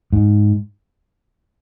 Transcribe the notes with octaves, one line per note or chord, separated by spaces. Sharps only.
G#2